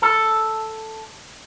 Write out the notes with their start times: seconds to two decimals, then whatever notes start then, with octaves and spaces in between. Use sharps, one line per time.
0.02 A4